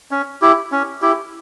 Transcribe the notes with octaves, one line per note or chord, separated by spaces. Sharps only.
C#4
E4 G4
C#4
E4 G4